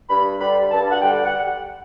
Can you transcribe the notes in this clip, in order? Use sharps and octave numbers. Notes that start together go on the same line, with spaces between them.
G2 B5
D3 G3 B5
G2 A5
F#5
D3 G3 G5
F#5